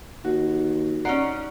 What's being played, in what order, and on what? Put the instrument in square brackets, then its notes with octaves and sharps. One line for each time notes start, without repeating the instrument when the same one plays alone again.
[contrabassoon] D#2 [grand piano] F#4
[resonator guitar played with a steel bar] C#4 D#4 D5 [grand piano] F#5 A#5 C7